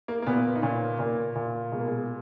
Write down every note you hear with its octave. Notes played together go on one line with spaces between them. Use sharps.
A#3
A#3
A#2 B3
D#4
A#2 C#4
A#2 A#3
A#2
B2 G#3
A#3
G#3